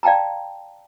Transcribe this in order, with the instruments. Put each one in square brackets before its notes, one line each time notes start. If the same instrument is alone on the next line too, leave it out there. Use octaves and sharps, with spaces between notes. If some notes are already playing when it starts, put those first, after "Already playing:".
[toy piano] D5 F5 G5 A5 A#5